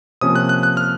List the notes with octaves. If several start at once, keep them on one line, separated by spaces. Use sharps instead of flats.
C3 F3 A#3 C#4 D#6
F#6
F#6
F#6
F6